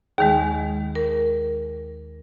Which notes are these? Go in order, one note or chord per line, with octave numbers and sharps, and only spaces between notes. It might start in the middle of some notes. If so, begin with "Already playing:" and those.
D#2 D#3 G#3 G#4
A#4